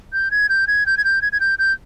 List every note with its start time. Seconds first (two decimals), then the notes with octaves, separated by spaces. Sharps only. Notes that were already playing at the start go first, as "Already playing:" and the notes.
0.13 G6
0.31 G#6
0.49 G6
0.67 G#6
0.86 G6
0.98 G#6
1.05 G6
1.22 G#6
1.33 G#6
1.40 G6
1.59 G6